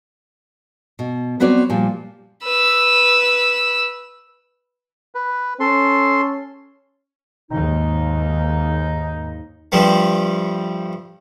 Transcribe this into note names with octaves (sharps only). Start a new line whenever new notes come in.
B2
F#3 B3 C4 F#4 C#5 D5
A#2 F3 G3
B4 E6
B4
C#4 A4 C6
D#2 G#2 D#4
G2 F3 G3 A3